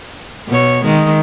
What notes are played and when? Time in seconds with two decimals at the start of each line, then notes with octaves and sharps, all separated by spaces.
0.48 B2 C#5
0.85 D#3 G#3